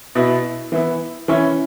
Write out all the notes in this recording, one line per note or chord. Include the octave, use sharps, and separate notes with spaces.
B2 B3 E4
E3 B3 E4
E3 C#4 E4